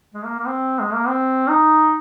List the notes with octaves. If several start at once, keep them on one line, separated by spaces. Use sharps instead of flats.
G#3
A#3
A#3
C4
G#3
A#3
C4
D#4